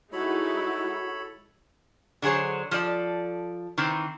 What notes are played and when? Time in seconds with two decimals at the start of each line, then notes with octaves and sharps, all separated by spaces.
0.13 G#3 D#4 E4 F#4 A4 C#5 B5
2.22 D3 F#3 G#4 C5 C#5
2.71 F3 A4 D5
3.78 D#3 E3 C4